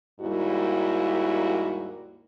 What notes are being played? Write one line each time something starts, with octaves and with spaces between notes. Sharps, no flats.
D#2 G#2 G3 A#3 E4 F#4